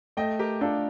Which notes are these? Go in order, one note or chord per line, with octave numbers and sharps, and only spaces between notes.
A3 D#5 G5
G4 A#4
D4 F4 A4